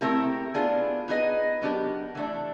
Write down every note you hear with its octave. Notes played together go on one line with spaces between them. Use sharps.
A3 C4 E4 G4 A#4
B3 D4 F4 G#4
B3 D#4 G#4 B4 D#5
F#3 B3 D4 G4 A#4
E3 A3 D4